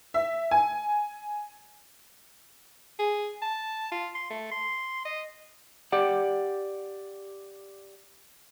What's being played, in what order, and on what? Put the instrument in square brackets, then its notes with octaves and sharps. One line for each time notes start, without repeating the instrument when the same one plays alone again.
[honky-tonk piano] E5
G#5
[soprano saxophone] G#4
A5
F4
C6
A3
C6
D#5
[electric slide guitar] G4 D5 F#5